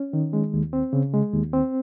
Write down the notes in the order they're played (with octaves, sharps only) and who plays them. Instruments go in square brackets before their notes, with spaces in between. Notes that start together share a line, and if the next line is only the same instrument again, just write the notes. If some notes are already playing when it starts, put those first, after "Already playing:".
Already playing: [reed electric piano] C#4
D#3
G#3
D#2
C4
C#3
G#3
D#2
C4